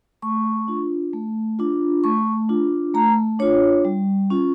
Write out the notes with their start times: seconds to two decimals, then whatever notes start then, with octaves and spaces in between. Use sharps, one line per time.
0.22 A3 C#6
0.68 D4 F4
1.13 A3
1.59 D4 F4
2.04 A3 C#6
2.49 D4 F4
2.94 A3 A#5
3.39 D4 F4 C#5
3.85 G3
4.30 C#4 F4